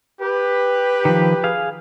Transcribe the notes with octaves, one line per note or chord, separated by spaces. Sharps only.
G4 B4
D#3 F3
G#4 F5